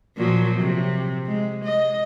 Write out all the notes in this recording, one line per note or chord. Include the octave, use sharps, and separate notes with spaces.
A#2 F3 F#3
C3
G#3
D#5